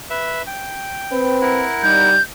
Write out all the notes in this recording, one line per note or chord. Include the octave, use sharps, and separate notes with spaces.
B4 E5
G5
C4 B4
E4 A#4 F#5
G3 D#4 G6